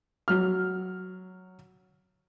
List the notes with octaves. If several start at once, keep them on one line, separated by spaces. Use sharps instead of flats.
F#3 F6